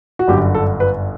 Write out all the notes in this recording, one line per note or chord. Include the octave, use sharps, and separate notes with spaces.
F#4
G1 F#2 D3 G4
A4
B4